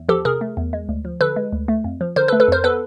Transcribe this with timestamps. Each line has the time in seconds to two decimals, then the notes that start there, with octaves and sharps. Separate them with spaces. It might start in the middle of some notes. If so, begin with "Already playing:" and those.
Already playing: E2
0.09 F3 G4 A4
0.25 C3 G#4 A#4
0.41 A3
0.57 E2
0.73 G#3
0.89 D2
1.05 F3
1.21 D3 A4 B4
1.36 G#3
1.53 D2
1.68 A3
1.84 F2
2.01 F3
2.16 D3 A#4 C5
2.28 A4 B4
2.33 A3
2.40 A4 B4
2.48 F2 A#4 C5
2.64 B3 A4 B4